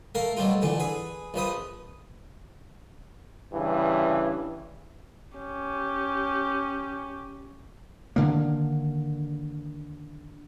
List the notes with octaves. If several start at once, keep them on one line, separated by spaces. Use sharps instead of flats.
A3 A#4 F5 A#5
B2 F#3 G3 A3 F4
A#2 D3 E3 A5
G#4 B4
A#1 F3 B4 D#6
G2 C#3 E3
C#4 G4
D3 D#3 A#3